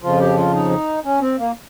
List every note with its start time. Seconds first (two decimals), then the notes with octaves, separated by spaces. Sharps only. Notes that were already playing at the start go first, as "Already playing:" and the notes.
0.03 F2 C#3 F3 F4
0.20 G4
0.37 F4
0.54 D#4
1.04 C#4
1.21 C4
1.38 A#3